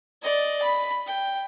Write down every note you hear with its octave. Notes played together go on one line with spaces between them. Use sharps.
D5 D#5
B5
G5